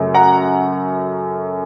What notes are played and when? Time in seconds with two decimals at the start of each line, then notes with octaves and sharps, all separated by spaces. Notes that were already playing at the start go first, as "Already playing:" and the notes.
Already playing: F#2 C#3 A3
0.14 F#5 A#5